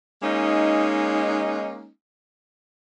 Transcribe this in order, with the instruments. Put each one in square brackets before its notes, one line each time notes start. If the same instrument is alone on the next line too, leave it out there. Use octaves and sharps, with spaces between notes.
[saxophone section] G#3 A#3 C#4 D#4